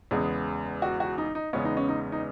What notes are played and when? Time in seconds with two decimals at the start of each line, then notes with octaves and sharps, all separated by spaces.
0.11 E2 C#3 G#3 B3 G#4
0.82 F#4
1.00 F#4
1.18 D#4
1.35 D#4
1.53 E2 C#3 G#3 B3 C#4
1.65 D#4
1.77 C#4
1.89 D#4
2.12 D#4